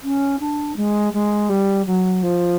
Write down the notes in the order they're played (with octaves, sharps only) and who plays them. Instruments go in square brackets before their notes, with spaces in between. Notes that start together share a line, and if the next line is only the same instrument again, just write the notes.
[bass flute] C#4
D4
G#3
G#3
G3
F#3
F3